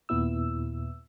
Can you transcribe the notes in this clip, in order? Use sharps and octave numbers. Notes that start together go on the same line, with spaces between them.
D#2 A#2 B3 E4 E6